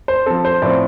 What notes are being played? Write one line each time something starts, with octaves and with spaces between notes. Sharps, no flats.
C5
F3 C4 A4
C5
A2 F3 C4 D5